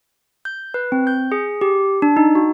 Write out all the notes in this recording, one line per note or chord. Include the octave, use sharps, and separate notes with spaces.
G6
B4
C4
G6
G#4
G4
D4
D#4
F#4